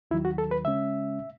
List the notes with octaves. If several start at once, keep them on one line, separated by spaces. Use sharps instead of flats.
D#2 D#3 F#3 E4
F#4
A4
B4
C#3 G#3 C#4 E5